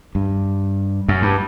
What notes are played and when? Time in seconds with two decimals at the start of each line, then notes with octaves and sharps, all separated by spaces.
0.15 G2
1.08 F#2
1.22 G2